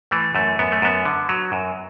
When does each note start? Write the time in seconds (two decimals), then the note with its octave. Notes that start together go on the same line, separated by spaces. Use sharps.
0.11 E3 A3
0.35 F#2 A3
0.59 F#2 B3
0.72 A3
0.82 F#2 B3
1.05 D3
1.29 F#3
1.52 F#2